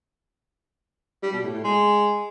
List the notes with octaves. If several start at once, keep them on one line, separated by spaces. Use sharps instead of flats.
G3
B2
A2
A2
G#3